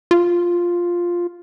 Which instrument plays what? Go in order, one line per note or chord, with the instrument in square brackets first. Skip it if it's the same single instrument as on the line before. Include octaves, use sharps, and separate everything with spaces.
[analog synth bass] F4